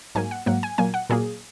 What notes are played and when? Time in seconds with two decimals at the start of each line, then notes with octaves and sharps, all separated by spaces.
0.15 G#2 F#3 A#3 G#5
0.31 F#5
0.46 G#2 F#3 A#3 F#5
0.63 G#5
0.78 A#2 F#3 A#3 G#5
0.94 F#5
1.10 A#2 F#3 A#3 G#4